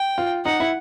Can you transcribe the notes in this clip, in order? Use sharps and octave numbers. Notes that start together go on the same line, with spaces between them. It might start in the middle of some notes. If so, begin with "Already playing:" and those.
Already playing: G5
F4
D#4 F#5
E4